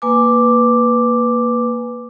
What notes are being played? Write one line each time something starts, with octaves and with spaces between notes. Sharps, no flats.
A#3 B4 G#5 D6